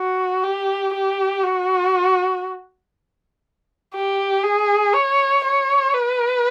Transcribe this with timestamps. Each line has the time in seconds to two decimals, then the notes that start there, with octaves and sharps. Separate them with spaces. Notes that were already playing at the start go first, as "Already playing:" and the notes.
Already playing: F#4
0.43 G4
0.94 G4
1.43 F#4
3.94 G4
4.44 G#4
4.94 C#5
5.44 C#5
5.94 B4